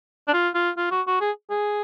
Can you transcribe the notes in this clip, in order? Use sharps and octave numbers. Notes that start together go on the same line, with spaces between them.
D4
F4
F4
F4
F#4
F#4
G#4
G#4